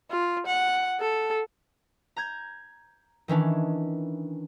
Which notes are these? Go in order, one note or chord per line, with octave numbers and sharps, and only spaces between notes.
F4
F#5
A4
A#5 G6 G#6
D#3 E3 C#4 D4